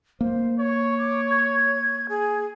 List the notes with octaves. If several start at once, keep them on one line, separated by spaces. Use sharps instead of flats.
A#3 C5
C#5 C#6
D6
G#6
G#4